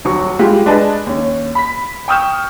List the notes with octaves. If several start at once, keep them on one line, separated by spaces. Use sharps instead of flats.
D#1 F#3 C#6
G3 G#3 F4 G4
G#3 D4 B4 D#5 G#5 A5
D#2 C#4
B5 B6
G5 C#6 D#6 F6 G6 E7